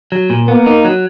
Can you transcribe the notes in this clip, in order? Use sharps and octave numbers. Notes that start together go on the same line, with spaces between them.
F#3
A#2
A#3 B3
D#4
F#3